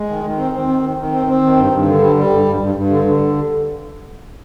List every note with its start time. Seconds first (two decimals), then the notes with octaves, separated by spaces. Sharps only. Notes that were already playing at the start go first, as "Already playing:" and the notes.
Already playing: G#3
0.09 D#3
0.24 D#3
0.38 C4
0.53 C4
0.68 D#3
0.83 D#3
0.97 D#3
1.12 C4
1.27 C4
1.42 D#3
1.57 G2
1.72 G2
1.86 D3
2.01 G3
2.16 G3
2.30 G2
2.46 G2
2.60 G2
2.75 G2
2.90 D3
3.04 D3